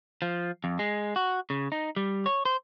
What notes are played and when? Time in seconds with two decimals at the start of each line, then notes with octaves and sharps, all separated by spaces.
0.22 F3
0.64 F2
0.79 G#3
1.16 F#4
1.50 C#3
1.72 D#4
1.96 G3
2.26 C#5
2.45 C5